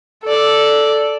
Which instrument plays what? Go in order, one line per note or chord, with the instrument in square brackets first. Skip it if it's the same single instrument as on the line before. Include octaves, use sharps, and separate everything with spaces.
[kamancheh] A4 D5